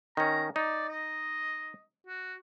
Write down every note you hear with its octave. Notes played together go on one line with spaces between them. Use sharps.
D#3 C#4 A#5
D#4 D5
D#5
F#4